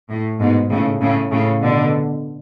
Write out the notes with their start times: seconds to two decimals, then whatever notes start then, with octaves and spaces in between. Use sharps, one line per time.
0.09 A2
0.40 G#2 B2
0.70 A2 C#3
1.01 A2 C#3
1.31 A2 C#3
1.61 B2 D3